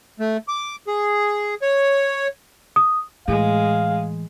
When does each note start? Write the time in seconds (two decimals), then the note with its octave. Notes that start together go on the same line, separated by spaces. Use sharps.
0.20 A3
0.48 D6
0.87 G#4
1.62 C#5
2.76 D#6
3.28 A2 E3 G#3 F5